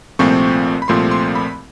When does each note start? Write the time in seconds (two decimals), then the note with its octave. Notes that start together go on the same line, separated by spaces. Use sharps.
0.19 C2 A#2 F3 A3 C4 C#6
0.82 B5
0.88 C2 A#2 F3 A3 C4 C6
1.11 C6
1.35 B5